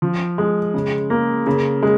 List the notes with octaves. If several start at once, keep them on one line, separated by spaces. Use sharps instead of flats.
F3
G#3
C#3
A#3
C#3
G#3